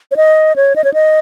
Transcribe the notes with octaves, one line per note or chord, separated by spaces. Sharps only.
C#5
D#5
C#5
D#5
C#5
D#5